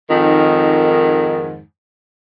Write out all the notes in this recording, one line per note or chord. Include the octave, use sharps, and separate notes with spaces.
F2 G#2 D#3